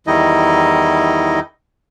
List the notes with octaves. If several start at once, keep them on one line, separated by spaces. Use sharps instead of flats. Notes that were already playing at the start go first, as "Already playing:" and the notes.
E2 D#3 G3 D#4 E4 D#5